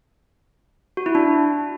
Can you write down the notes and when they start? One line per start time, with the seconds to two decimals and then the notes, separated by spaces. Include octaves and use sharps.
0.97 F#4
1.06 E4
1.15 D4